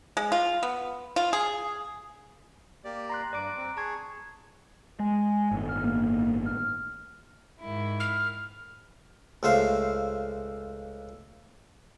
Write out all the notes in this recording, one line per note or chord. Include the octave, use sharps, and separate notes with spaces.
G#3
F4
B3
F4
G#4
A#3 G4 D5
A#5 C6 F#6
G2 D5 D6 D7
C4
G#4 A5 C#6 G#6
G#3 G#5
G1 A2 D#3
F6
A#3
F6
G#2 D#3 E4
F6
C#2 A3 C5 F5